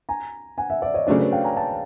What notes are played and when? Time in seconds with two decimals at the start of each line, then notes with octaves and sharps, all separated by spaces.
0.09 G#5 A#5
0.58 F#5 G#5
0.70 E5 F#5
0.82 D5 E5
0.94 C#5 D#5
1.07 C#3 F#3 A3 D4 C5 D5
1.19 B4 C#5
1.32 F5 G5
1.44 G#5 A#5
1.57 G5 A5